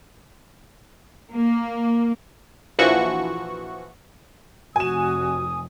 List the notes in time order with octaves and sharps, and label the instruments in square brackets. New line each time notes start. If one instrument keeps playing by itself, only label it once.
[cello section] A#3
[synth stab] A#1 E3 F3 F#4 C#6
[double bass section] F1 [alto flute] F#4 [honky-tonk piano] G#5 E7 [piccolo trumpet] D#6